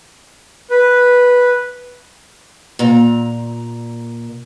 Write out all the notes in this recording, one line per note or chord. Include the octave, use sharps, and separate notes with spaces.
B4
A#2 A#5